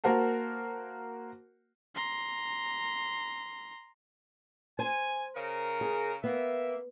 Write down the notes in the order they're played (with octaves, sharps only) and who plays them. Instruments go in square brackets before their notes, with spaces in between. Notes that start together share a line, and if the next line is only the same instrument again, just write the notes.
[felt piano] A#3 F#4 A#4 C5 F#5 A5
[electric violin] A#5 C6
[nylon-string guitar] C5 [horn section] G#5
[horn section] C#3 A#4
[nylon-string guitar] G#4
[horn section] A#3 E5 [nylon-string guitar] B3